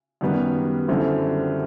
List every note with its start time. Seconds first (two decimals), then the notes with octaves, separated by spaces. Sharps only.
0.21 F#2 D#3 G3 B3
0.88 F#2 D3 G3 C4 E4